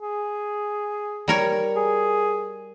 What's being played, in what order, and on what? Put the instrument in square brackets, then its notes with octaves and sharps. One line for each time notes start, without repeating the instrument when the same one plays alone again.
[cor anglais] G#4
[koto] G3 A#4 C#5
[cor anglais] G#4